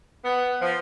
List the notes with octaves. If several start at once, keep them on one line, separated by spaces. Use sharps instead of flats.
B3
F3